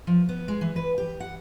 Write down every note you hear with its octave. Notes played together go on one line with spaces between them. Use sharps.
F3
B3
G#3
E3
B4
G4
F#5